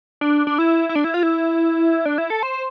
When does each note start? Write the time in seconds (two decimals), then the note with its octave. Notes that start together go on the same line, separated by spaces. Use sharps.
0.21 D4
0.47 D4
0.58 E4
0.89 E4
0.95 D4
1.04 E4
1.14 F4
1.23 E4
2.05 D4
2.18 E4
2.30 A4
2.43 C5